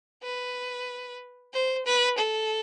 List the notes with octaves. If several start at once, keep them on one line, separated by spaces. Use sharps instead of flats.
B4
C5
B4
A4